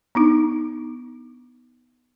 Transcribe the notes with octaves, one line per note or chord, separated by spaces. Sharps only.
B3 D4 D#4